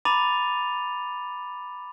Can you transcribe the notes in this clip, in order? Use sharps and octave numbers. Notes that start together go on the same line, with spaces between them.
A#5 B5 D6 A6 D#7 F7